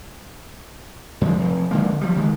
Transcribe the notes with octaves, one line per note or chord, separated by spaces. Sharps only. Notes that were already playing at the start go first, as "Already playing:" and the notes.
F#2 F3 F#3 G#3
F1
F1 D3 G#3 A#3
F3 G3
C#2 D#3 G#3